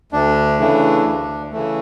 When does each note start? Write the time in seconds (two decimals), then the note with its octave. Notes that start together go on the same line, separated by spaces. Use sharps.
0.12 D2 D4
0.59 C#3 E3 A3
1.05 D2
1.52 C#3 E3 A3